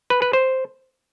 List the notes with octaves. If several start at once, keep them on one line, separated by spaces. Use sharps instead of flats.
B4
B4
C5